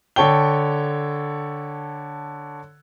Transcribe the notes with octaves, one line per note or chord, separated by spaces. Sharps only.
D3 A4 C#5 G5 G7